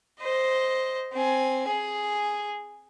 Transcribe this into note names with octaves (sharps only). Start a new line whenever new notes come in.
C5 D#5
C4 G#5
G#4